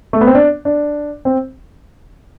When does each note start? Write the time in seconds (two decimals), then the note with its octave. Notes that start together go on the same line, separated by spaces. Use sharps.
0.13 A3
0.21 B3
0.27 C4
0.35 D4
0.65 D4
1.25 C4